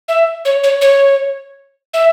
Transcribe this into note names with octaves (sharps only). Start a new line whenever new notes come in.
E5
C#5
C#5
C#5
E5